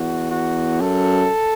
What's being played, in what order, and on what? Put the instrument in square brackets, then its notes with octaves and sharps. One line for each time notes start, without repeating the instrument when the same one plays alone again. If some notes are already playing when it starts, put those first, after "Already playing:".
Already playing: [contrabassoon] E2 [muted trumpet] F#4
[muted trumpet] F#4
[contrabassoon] F#2 [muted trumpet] A4